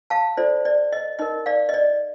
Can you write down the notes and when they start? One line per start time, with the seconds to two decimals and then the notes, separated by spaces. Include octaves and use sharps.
0.10 F5 A5
0.37 F4 A4 C5 D5
0.65 D5
0.93 D#5
1.19 D#4 A#4 D#5
1.46 D5 F5
1.69 D#5
1.74 D5